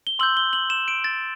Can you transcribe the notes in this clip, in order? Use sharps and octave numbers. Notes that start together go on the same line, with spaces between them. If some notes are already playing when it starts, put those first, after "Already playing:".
G7
C6 E6 G6 F#7
G7
F#7
E7
D7
A6